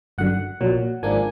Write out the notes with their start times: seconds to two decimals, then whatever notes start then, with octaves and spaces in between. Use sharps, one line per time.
0.18 G1 F#2 D3 F#5
0.61 A#1 A#2 F#3
1.03 G#1 G#2 F3 A#3 D4 G#5